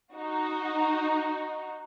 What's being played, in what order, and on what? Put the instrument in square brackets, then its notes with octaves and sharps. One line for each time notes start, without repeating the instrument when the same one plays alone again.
[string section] D#4 F#4